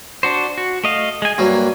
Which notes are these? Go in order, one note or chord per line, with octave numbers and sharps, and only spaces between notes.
D4 F#4 C5
F#4
A3 D#5 F5
G#3 G#5
G2 F#3 A#3